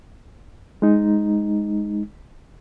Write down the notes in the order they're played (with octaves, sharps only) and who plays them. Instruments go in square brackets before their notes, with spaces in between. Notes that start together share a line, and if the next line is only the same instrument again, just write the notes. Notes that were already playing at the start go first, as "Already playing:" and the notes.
[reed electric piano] G#3 D#4